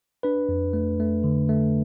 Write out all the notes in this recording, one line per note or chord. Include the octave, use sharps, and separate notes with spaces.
D4 B4
F2
A3
A3
D3
A3